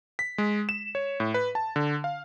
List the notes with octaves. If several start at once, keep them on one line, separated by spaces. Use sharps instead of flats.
B6
G#3
E7
C#5
A2
B4
A5
D3
F5